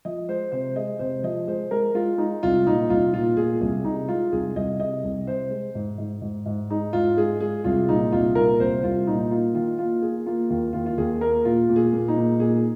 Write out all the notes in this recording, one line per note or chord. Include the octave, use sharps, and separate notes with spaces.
F3 D#5
G#3 C5
C3 C5
G#3 D#5
C3 C5
F3 D#5
G#3 C5
G#3 A#4
G#3 F4
G#3 D#4
C2 F4
A#2 D#4
C2 F4
A#2 F4
A#2 G#4
C2 G#4
C3 D#4
G#3 F4
C2 G#4
C2 D#5
C3 D#5
C2
C3 C5
G#3
G#2
G#2
G#2
G#2
G#3 D#4
G#2 F4
G#3 G#4
G#3 G#4
C2 F4
A#2 D#4
C2 F4
A#2 A#4
C2 C5
C2 F4
A#2 D#4
A#3 F4
D#3 F4
A#3 F4
A#3 G#4
A#3 F4
D#2 F4
D#2 F4
F4
D#2 G#4
A#3 A#4
A#2 F4
A#2
G#4
A#2
D#4
A#2
A#2 G#4